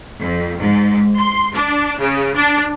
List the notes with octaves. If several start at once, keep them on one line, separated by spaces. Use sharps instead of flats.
F2
G#2
C6
D4
C#3
D4